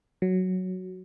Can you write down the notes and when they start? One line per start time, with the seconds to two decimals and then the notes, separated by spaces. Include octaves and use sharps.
0.22 F#3